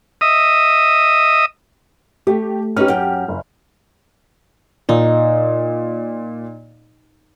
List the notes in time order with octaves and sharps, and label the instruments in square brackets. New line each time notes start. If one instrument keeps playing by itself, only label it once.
[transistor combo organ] D#5 E5 D#6
[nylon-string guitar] A3 [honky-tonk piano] G4
[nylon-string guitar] C#4 D#4 B4 [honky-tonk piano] G4 F6
[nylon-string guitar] F#2 G5
[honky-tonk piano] F#1
[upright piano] A#2 [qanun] D#4